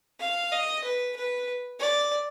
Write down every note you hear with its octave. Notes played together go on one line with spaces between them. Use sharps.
F5
D#5
B4
B4
D5